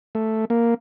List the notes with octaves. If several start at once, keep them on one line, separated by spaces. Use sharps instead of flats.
A3
A#3